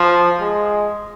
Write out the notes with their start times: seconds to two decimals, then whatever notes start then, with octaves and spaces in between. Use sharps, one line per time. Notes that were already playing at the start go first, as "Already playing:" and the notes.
Already playing: F3
0.40 G#3